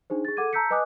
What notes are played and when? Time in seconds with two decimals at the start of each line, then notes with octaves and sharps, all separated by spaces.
0.10 D4 D#4 G#4 C5
0.25 G#4 A6
0.37 A4 F#5 D6 G#6 D#7
0.53 A5 A#5 E6 G6 B6 C#7
0.70 B4 D#5 G#5 D6 D#6 F#6